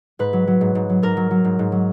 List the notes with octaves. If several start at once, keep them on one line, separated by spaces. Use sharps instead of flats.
G#2 B4
F#3
F#3
G#2
G#2
F#3
G#2 A#4
F#3
F#3
G#2
G#2
F#3